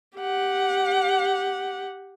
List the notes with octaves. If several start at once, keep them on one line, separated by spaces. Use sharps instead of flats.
G4 F#5